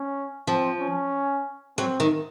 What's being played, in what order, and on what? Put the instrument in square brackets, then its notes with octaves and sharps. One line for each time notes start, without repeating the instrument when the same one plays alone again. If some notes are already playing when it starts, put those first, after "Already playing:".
Already playing: [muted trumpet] C#4
[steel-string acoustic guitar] F3 [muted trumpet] C4
[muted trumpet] C#4
[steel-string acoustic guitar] F#3 [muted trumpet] C4
[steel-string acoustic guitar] D#3